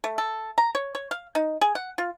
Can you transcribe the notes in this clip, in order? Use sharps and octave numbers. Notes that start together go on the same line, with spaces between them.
A3
A4
A#5
C#5
C#5
F5
D#4
G#4
F#5
F4